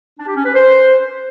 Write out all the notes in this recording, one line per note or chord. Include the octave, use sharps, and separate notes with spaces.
D4
G4
C#4
B4
C5